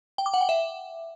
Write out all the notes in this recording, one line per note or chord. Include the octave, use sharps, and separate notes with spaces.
G5
D6
F#5
G5
E5